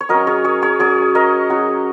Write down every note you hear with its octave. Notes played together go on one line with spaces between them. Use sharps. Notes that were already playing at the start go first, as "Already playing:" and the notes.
C#5
F#3 C#4 A#4 D#5
G#4 C#5
G#4 C#5
G#4 C#5
F#3 C#4 G#4 C#5
A#4 D#5
F#3 C#4 F#4